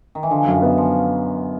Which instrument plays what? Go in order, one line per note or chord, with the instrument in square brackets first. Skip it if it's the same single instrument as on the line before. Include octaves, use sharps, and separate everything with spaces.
[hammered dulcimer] D#3
E3
[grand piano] D3 [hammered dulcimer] F3
[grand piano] F#2 [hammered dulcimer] D#3
[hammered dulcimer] E3 [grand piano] B3
[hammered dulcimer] F3